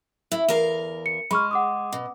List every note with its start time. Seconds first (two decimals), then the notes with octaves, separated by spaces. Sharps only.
0.32 E4
0.48 E2 A#4 F5
1.06 C#7
1.31 G#3 B5 C#6 F6
1.51 F#5 D6 D#6
1.92 B2